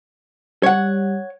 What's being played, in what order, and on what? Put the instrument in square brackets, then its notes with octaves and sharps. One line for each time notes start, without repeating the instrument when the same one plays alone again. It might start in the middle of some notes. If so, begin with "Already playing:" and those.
[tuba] G3 [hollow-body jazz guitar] C#5 F#5